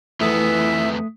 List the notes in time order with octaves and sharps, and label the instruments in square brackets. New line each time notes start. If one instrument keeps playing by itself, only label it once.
[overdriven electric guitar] F2 B3 [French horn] E3 [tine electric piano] A3 D#6 B6 [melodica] E5